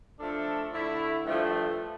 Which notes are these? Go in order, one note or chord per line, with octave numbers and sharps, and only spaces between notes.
F3 A3 D4 A4
D3 A3 E4
G2 F3 A3